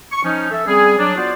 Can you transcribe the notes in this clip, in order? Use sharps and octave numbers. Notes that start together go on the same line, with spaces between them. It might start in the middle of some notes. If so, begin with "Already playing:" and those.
C#6
F3 C#4 D#4
A4 E5
G3 C4 C#4 G#4
F#3 D4
B3 F4 F#4 C5 D5